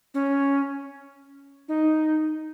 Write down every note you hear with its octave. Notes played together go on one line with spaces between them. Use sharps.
C#4
D#4